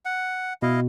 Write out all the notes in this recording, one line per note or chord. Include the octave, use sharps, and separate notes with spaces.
F#5
B2 E4 D#5 F5